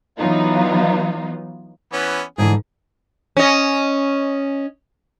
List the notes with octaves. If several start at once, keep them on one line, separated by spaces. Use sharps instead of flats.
E3 F#3 B3 D#4 F4
E3 B3 C#4
G#2 D3 E3 G#4
C#4 D#5